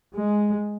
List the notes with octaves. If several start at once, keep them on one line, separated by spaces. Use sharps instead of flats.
G#3